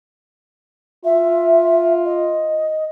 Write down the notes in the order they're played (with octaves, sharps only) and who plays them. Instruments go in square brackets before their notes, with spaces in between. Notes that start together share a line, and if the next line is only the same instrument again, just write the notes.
[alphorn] F4 [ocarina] E5
[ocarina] D#5